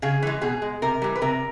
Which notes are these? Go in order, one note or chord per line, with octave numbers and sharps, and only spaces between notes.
C#3 G#4
E3 G#3
B2 G#4
G#3
C3 A#4
E3 G3
B4
C3 A#4